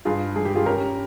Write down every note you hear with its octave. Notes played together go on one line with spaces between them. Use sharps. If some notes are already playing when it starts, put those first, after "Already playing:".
G2 F4 G#4
G2 G#4
G4
F4 G#4
C#4 G4 A#4